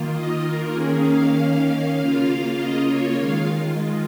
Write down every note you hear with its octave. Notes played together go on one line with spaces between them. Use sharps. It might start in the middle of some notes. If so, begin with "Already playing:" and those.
Already playing: D#3 A#3 F4
D#5
A#4
D#3 A#3 C#4 G#4
F5
C#3 A#3 F4
D#5
C#5
D#3 G#3 F4 F5